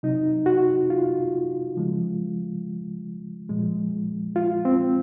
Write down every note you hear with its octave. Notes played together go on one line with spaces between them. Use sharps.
C3 F#3 D#4
F#4
F4
C#3 F3 G#3
A#2 F3 G#3
F4
C4